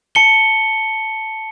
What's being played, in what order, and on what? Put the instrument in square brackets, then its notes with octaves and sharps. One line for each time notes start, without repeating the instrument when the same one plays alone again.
[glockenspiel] A5 C#7 G7